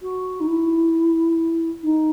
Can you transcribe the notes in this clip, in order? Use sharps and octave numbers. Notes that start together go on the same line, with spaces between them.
F#4
D#4
E4
D#4